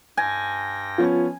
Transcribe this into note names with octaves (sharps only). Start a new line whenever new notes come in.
G2 G5 G#5 A#6
F3 B3 C#4 F4